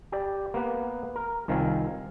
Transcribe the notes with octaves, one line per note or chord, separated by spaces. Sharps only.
G4 D5
A#3 B3 B4
A#4
C2 D#3 C4 F4 F5 G#5